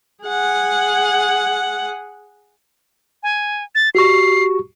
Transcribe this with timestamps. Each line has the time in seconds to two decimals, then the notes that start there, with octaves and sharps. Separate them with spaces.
0.24 G#4 F#5
3.23 G#5
3.75 A6
3.95 F#4 G4 C#6 C7